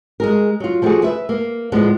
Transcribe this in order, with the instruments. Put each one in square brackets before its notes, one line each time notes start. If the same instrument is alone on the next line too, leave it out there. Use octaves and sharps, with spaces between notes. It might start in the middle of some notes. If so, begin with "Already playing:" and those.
[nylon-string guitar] G#3 G#4 A#4
F#3 F4
F3 A3 B3 D4 F#4 G#4
B4 E5
A#3
A2 F3 G#3 B3 D4